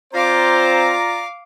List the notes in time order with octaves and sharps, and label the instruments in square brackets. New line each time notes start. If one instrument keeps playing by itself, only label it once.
[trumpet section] C4 C5 [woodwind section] F4 D5 A#5 [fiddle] F5 D6